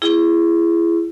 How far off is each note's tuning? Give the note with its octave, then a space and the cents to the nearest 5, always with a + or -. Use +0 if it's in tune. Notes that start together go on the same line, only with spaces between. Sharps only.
E4 +30 G#4 +0